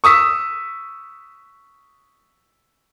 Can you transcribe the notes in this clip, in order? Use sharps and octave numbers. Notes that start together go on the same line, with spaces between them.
C#6 D#6 E6 B6